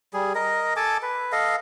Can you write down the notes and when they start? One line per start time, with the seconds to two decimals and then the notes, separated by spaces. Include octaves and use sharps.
0.14 G3 G#4
0.35 A#4 D#5
0.76 A4 G#5 A5 D6
1.03 B4
1.32 A4 D#5 F5